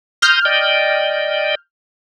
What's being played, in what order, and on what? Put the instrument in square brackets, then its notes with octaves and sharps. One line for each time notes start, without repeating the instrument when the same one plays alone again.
[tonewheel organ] A#5 C6 D#6 [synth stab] F6 G6
[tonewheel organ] D5 D#5 G5